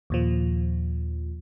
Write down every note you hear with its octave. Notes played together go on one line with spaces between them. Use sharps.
D#2 A#2 F3